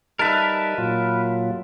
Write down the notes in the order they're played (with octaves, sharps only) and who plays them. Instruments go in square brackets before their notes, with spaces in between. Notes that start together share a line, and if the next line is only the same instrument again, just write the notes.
[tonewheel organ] G3 D#4 [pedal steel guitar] A#4 B4 [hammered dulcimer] E5 A5
[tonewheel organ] A#2 F#3 F4